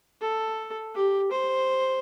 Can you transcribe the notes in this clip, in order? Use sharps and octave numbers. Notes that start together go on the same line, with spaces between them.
A4
G4
C5